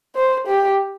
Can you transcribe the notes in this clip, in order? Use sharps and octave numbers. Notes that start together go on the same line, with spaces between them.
C5
G4